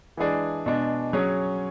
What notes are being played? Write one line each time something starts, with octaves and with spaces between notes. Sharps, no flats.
E3 G#3 D4 G#4 D5
B2 G#3 D4
F#3 C#4 G#4 C#5